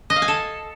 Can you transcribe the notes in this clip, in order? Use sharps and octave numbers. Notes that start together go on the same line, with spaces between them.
D#5
F5
G#5
A4